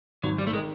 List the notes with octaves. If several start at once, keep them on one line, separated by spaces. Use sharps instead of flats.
G#1 F#3
G3
A3
D#3 G#3